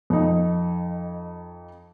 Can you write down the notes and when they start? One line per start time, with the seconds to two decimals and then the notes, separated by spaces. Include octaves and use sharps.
0.10 F2 D#4